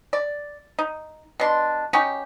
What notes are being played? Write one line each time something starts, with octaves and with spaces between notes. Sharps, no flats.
D5
D#4
B2 D4 C6
C#4 D#4 F#4 G4